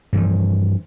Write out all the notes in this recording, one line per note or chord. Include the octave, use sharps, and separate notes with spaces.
G2 E3 F3